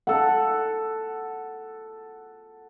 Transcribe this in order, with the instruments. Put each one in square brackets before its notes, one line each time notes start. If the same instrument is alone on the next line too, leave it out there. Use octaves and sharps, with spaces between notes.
[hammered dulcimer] A4 F#5